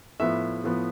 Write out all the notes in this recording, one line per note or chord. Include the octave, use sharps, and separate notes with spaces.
A2 F3 B3 E5
A2 F3 B3